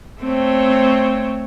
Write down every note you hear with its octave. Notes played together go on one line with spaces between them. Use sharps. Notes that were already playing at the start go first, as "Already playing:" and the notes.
A3 C4 C#5